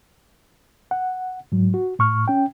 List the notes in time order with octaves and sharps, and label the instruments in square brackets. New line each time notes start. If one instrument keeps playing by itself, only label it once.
[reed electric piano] F#5
G#2 F#3
F#4
A2 C#6 F6
C#4 G5